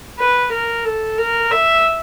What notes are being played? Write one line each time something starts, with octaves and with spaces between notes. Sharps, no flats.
B4
A#4
A4
A#4
E5